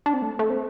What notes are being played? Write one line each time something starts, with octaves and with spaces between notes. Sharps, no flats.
D4
C4
A3
A3
C4